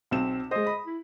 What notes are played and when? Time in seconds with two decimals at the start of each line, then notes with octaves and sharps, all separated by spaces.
0.11 B1 C4 E7
0.51 G#3 C5 D#5
0.67 B5
0.86 E4